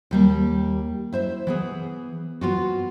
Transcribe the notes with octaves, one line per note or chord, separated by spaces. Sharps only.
D#2 G3 A#3
E4 C5 E5
E3 B3 G#4
B3 F4 F#4